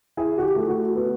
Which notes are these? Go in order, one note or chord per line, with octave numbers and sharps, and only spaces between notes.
E4 G#4
F#4
G4
A3
F#4
B3